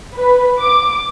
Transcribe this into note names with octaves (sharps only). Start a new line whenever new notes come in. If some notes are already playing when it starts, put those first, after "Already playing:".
B4
D6